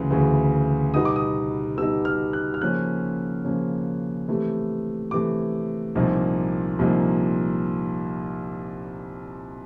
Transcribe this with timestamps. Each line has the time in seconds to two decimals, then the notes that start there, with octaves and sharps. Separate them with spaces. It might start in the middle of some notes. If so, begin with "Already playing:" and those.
Already playing: D2 C#3 E3
0.10 D2 C#3 E3
0.94 B2 G3 B3 D#4 D#6
1.05 D6
1.16 D#6
1.78 B2 G3 B3 D#4 E6
2.05 F6
2.33 F#6
2.54 F6
2.61 C#3 F3 A#3 C#4 F#6
3.45 C#3 F3 A#3 C#4
4.28 C3 E3 A3
5.11 C3 E3 A3 D6
5.95 C2 A#2 F3 A#3 D#4
6.79 C2 A#2 F3 A#3 D#4